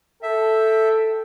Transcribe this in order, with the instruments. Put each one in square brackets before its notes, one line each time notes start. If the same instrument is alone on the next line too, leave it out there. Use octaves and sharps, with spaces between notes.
[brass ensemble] A4 G5 [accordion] E5